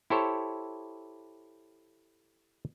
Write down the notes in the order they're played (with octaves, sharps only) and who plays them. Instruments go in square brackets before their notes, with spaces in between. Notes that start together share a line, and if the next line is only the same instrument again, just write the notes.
[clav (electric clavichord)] E4 G4 A4 C5 C#5